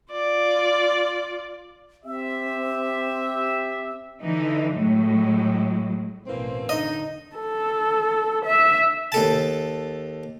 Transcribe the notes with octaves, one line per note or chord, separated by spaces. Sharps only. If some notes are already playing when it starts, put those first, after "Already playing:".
F4 D5
C4 G4 E5
D3 E3 D#4
A2 F#3 G#3
A1 E2 B2 E3 A#3 C4
D3 D#4 D#5
A4
E5
D#2 A4 A5